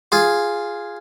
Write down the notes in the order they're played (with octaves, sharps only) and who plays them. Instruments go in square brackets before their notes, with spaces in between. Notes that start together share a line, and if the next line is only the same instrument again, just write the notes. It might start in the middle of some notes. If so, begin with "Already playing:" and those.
[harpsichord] F4 G#4